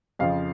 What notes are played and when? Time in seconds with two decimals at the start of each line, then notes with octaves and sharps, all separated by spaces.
0.19 F2 C#3 F3 F5